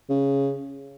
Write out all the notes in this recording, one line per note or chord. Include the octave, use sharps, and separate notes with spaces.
C#3